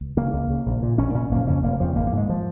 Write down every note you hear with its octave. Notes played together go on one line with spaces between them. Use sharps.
C#2
C#3 A#3
C#2
C#3
A#1
A#2
A#1 C#4
A#2 C#4
F1 A#3
F2 C#3 C#4
F1 A#3
F2 C#3 F3
G#1 A#3
A#3
G#2
G#3
F3